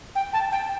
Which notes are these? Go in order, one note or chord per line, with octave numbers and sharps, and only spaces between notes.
G5
A5
G5